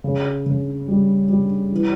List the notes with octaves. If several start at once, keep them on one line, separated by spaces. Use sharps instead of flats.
C#3
C#3
G3
G3
E3